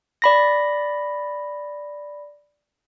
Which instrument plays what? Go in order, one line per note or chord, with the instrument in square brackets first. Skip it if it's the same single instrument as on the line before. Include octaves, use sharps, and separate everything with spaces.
[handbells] D5 B5 A#6